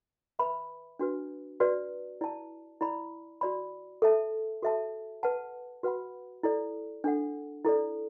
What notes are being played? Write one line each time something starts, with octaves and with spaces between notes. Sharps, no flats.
B4 E5 B5
D4 F#4 B4
F#4 B4 D5
E4 D5 A5
E4 D5 B5
F#4 D5 B5
A4 E5 A5
F#4 A4 E5 A5
B4 F#5 A5
F#4 B4 F#5 B5
E4 A4 D5
D4 A4 F#5
E4 A4 D5